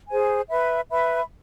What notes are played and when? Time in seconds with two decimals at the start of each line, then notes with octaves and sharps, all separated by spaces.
0.09 G#4 C5 G#5
0.49 B4 E5 B5
0.89 B4 E5 B5